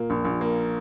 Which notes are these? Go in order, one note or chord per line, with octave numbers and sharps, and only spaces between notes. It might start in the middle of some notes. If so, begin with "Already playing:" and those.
Already playing: A#2 A#3
A#1
A#1
A#3